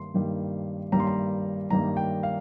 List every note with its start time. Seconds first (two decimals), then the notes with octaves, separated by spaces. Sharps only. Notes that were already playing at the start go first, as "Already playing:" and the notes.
Already playing: G2 D#3 G3 A#3 C6
0.14 G2 D#3 G3 A#3
0.92 G2 D#3 G3 A#3 A#5
1.00 C6
1.07 A#5
1.70 G2 D#3 G3 A#3 A#5
1.97 G5
2.23 F5